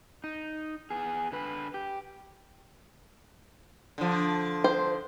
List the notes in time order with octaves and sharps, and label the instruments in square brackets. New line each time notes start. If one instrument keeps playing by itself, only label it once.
[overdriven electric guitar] D#4
B3 G#4
D3 B4
G4
[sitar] D3 F3
[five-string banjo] C5